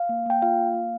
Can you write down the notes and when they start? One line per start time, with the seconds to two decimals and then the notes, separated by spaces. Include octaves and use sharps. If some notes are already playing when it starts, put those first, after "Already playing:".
Already playing: F5
0.09 A#3
0.26 A#3 G5
0.42 F4 F5
0.58 A#3
0.74 A#3